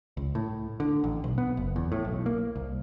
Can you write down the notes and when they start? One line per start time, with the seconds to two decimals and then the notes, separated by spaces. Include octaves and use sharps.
0.17 C#2
0.35 A2
0.80 D3
1.04 A1
1.24 B1
1.38 B3
1.57 F#1
1.76 E2
1.92 A2
2.05 B1
2.26 A#3
2.56 C2